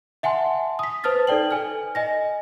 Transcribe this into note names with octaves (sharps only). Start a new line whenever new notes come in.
E5 F#5 G#5 A5 C6
D#6 B6
B4 C5 A5 D#6 F6 A6
D#4 A4 D5 G5 F#7
A4 G#5 F6
D#5 G#5 A#6